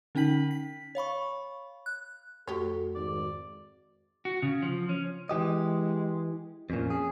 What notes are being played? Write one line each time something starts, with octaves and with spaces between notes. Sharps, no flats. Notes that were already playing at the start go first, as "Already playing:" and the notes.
D3 C#4 D#4 G5 B6 F#7
B6
C#5 F5 B5 C#6
F#6
F2 A3 F#4 G4 A4 C#5
G#1 D5
F#4
C#3
F3
C#4
E3 G#3 G4 D#5
F2 A#2 C#4
G#4